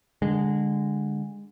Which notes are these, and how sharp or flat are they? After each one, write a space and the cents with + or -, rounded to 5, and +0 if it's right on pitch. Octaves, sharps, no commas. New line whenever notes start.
D3 +0 G#3 -20